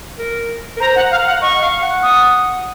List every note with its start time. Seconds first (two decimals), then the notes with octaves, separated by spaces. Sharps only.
0.19 A#4
0.76 A#4
0.80 C5 A#5
0.96 F#5
1.11 F5
1.26 F#5
1.42 D#5 C#6
1.62 F5
1.82 F#5
2.03 D#6